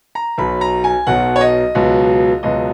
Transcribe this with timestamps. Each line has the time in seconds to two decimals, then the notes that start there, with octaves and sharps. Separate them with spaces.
0.15 A#5
0.38 B1 B2 F#3 B5
0.61 A#5
0.84 G#5
1.07 B1 B2 F#3 F#5
1.36 C#5
1.41 D#5
1.75 C#2 B2 F#3
2.43 C#2 B2 F#3 D#5